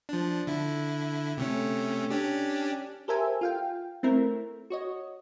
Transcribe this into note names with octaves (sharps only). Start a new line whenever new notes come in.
F3 D4
D3 E4
C3 A3 C#4
C#4 D4 G4
G4 A4 A#4 C5 E5 G#5
F4 F5 G5
A3 C4 E4 A#4
F#4 C#5 D#5